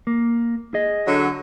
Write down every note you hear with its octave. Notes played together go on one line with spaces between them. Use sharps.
A#3
G#4 D#5
D3 F#3